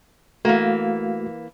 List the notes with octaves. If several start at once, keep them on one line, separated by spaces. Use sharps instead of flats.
E3 A3 A#3 F#4 F5